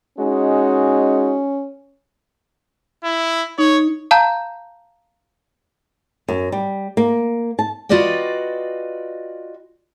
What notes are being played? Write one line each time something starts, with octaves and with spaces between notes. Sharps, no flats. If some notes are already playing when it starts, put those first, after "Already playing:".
G#3 C#4 D#4 F#4
E4
D#4 C#5
F5 A5 A#5 G6
F#2
G3
A#3
A5
F4 F#4 B4 D5 D#5 G5